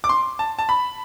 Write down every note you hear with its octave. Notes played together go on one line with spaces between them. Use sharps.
D6
C6
A5
A5
B5